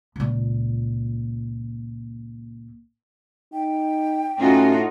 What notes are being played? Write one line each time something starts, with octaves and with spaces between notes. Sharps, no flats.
C#2 A#2
D#4 G5
A2 C#4 D#4 F4 F#4